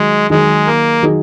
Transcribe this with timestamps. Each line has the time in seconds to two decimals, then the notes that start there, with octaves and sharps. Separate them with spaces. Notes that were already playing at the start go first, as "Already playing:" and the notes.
Already playing: D#3 F#3 G#3
0.30 D#3 F#3 G#3 D#4 G#4
0.66 A#3
1.03 D#3 F#3 D#4 G#4